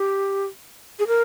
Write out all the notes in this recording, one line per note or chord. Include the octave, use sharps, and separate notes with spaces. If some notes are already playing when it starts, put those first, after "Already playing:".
Already playing: G4
G#4
A#4